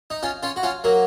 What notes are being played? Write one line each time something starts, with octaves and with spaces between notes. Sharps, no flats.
D#4
C#4 F4
C#4 F4
F#4
C#4 F4
F#3 A#3